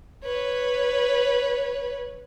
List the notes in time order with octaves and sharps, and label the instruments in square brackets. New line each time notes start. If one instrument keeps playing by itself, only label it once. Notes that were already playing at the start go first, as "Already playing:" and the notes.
[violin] B4 C#5